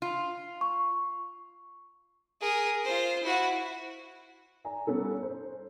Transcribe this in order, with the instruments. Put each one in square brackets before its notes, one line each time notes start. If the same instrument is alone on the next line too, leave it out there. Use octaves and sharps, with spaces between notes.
[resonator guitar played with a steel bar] F4
[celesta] C#6
[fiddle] G#4 A#4
F4 C5
E4 F#4
[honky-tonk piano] D5 G#5 A#5
G3 B3 C#4 A4
C5